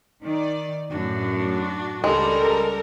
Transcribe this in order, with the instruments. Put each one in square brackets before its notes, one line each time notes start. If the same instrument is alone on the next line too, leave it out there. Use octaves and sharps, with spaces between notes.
[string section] D#3 D5
[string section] F#2 A2 [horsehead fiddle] D4 F#4
[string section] C#2 G3 [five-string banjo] G#3 [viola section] A4 A#4